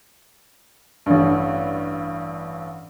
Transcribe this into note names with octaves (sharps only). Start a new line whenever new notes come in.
A1 G2